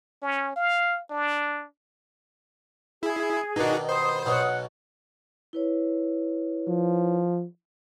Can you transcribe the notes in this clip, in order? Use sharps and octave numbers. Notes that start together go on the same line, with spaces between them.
C#4
F5
D4
E4 G#4
B2 D#3 D4 D#4 F#4
G2 C5 B5 C6 D#6
B1 B2 C#4 F#5
E4 B4 C#5
F3